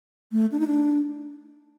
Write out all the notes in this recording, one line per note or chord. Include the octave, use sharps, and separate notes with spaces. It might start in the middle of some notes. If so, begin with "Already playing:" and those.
A3
D4
D#4
D4